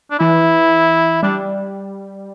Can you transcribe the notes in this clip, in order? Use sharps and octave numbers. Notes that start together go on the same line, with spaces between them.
D4
E3 E4
G3 D4